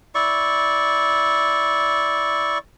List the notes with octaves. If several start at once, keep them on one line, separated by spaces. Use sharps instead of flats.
E4 D5 C#6